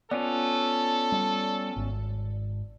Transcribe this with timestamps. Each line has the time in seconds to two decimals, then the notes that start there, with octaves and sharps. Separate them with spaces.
0.11 B3 C#4 F4 A4 D5
1.12 G3
1.76 G#1